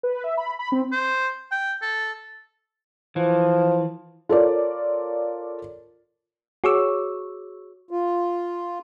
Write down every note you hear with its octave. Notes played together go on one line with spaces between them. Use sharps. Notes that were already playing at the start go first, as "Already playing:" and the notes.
B4
E5
B5
B5
C4
C5
G5
A4
E3 F3
F4 A4 A#4 C#5 D5
F#4 G#4 C#5 C#6 D6 E6
F4